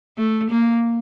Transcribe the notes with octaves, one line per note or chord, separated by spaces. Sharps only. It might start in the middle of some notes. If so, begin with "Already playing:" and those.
A3
A#3